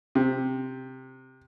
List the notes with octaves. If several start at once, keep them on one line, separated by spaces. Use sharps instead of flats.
C3